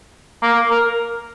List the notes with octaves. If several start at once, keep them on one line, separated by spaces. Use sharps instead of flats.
A#3
A#4